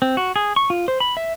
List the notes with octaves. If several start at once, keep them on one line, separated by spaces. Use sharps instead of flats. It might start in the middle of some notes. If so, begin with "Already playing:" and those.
C4
F#4
G#4
C#6
F4
C5
B5
E5